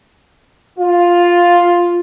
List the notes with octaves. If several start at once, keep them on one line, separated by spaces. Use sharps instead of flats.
F4